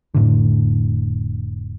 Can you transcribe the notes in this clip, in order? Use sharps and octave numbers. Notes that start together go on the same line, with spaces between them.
F1 A2 D3